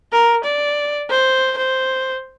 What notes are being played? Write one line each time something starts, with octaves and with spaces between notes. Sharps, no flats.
A#4
D5
C5
C5